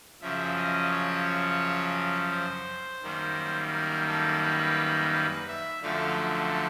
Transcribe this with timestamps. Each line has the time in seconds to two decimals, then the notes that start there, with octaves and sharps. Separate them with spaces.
0.21 F#2 C#3 F3 E5
0.57 D#5
0.91 C#5
2.32 C5
3.02 F#2 D#3 G3 A#3
3.72 A#4
4.07 A4
4.43 B4
5.12 B4
5.48 E5
5.82 F#2 D3 F3 A3 F5